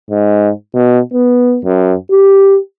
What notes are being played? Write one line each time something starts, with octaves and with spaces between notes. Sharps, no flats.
G#2
B2
B3
F#2
G4